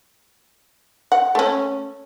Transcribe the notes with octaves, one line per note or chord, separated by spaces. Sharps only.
F#5
A3 C#4